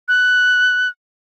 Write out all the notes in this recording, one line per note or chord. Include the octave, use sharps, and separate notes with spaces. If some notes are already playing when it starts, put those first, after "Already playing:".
F#6